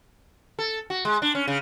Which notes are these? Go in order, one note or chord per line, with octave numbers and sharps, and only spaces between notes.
A4
F#4
G#3
D4
C#4
C#3